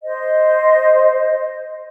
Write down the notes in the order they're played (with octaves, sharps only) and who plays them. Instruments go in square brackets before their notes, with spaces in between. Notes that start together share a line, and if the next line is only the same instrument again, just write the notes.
[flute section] C5 D#5